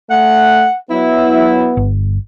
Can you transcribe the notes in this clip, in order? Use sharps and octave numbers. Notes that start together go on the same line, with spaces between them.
A3 F#5
F#3 B3 E4
G1